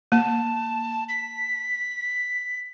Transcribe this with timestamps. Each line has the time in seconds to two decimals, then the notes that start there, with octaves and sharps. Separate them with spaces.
0.12 A#3 A5
1.09 B6